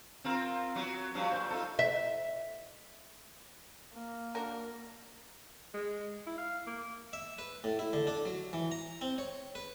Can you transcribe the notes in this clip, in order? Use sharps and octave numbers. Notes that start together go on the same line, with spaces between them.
C4 F4 A#4
F#3 B3 F#4
G2 F3 F#3
A#2 C5
D#4 F4 A4
E5
A#3
D4 F#4 A#4
G#3
E4
F5
A#3
E5
B4
A2
E4
D3
D4
F#3
E3
A#5
C4
C#5
B4